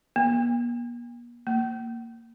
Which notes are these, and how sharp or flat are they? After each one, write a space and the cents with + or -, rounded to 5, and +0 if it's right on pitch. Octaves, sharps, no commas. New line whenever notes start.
A#3 +45
A#3 -15